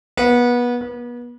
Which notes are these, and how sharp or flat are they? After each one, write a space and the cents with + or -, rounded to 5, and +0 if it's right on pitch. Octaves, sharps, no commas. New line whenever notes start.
B3 -25
B3 -35